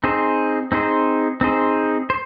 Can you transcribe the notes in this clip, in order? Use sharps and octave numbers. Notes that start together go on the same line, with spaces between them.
C4 D#4 G#4 C5
C4 D#4 G#4 C5
C4 D#4 G#4 C5
C5